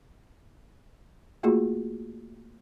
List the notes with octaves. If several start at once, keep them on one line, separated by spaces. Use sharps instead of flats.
A3 A#3 F4 F#4 G#4